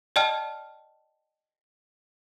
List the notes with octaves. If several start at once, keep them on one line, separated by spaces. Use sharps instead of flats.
D5 D#5 G5 A5 F6